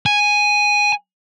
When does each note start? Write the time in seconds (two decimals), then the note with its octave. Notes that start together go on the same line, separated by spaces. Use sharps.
0.06 G#5